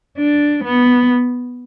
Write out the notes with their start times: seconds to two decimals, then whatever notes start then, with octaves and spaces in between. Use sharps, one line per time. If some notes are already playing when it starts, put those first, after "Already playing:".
0.17 D4
0.64 B3